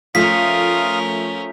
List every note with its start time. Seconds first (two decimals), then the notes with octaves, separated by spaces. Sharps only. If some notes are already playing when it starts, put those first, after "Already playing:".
0.15 F3 A3 C#4 F4 A#4 F5 D#6 B6